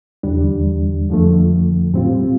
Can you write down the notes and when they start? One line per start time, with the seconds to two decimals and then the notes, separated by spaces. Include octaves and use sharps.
0.23 E2 D3 G3 D4
1.09 F2 D3 F3 A3
1.94 A2 G3 C4 F4